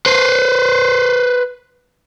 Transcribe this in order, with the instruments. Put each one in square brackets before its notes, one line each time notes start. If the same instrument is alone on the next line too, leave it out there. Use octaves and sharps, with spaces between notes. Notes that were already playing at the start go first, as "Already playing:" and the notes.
[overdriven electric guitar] B4 C5